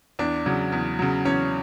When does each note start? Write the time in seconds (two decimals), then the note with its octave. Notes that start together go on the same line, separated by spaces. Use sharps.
0.19 E2 D4
0.46 C#3 F#3
0.72 E2
0.99 C#3 F#3
1.25 E2 C#4